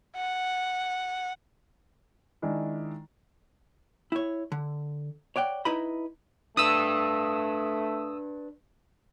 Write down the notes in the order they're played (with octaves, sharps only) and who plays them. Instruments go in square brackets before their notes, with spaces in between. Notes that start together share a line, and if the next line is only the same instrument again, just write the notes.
[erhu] F#5
[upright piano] D#3 G#3 D4 E4
[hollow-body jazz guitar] E4 C#5
D3
C#5 D5 F#5 G5
D#4 E4 B4 D#5 A#5 B5
[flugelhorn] A3 [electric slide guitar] D4 B4 [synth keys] D#6 E6